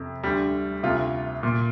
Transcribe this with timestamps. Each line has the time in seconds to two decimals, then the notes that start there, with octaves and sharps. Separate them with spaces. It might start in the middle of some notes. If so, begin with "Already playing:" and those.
Already playing: F2 C3
0.23 D2 D3 G3
0.83 D2 C3 F4
1.43 A#2